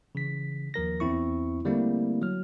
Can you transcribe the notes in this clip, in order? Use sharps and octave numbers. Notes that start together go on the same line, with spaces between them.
C#3 E3 B6
D#2 F3 A#4 A#6
E2 C4 E4 C#6
D3 G3 A3 A#3 C4 E4
F#3 F6